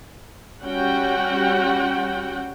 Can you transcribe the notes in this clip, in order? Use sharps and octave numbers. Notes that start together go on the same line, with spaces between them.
G3 C#4 F#4 F#5 G5